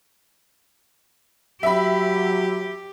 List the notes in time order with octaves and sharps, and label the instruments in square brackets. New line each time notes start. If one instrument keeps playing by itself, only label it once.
[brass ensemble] F#3 [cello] G4 [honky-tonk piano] E5 B5